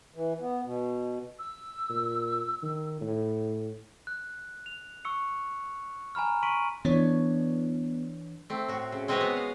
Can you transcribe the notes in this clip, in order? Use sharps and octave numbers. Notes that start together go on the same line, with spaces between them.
E3
B3
B2
E6
A#2
D#3
A2
F#6
F7
C#6 E6 C#7
G#5 A#5 B5 F6
C6 C#6 B6 D7 D#7 F#7
E3 B3 D4 C#5
A3 C4
A2 F#4
C#3
G#3 C4 F#4 B4 C#5 D#5
B3
F5